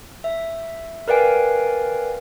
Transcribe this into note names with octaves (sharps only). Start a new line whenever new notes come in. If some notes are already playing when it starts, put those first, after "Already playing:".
E5
A#4 B4 D5 F5 G5 G#5